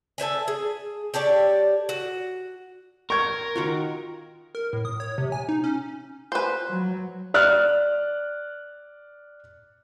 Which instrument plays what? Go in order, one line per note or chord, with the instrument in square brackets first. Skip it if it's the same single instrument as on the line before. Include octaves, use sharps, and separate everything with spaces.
[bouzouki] A4 C5 E5 G#5
G#4
G4 A4 C#5 D5
F#4
[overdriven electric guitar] A#4 [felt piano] C#6 G#6
[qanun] D#3 F4 F#4
[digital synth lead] A#4
A2
D#6
C#5
C3
G#5
D#4
C#4
[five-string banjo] B4 C5
[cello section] F#3
[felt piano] D5 F6 F#6